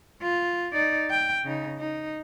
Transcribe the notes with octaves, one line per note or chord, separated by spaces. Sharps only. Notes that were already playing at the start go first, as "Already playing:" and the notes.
F4
D#4 D5
G5
C#3 D#4
D#4